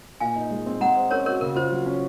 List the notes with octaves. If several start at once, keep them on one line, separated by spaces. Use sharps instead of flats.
A#2 F5 G#5
D#4
G#3
C4
G#3 F#5 A#5
C5
C#4 A#4 C#5
F#4 A#4 C#5
C#3 A#4
F4 C5
F#3
C#4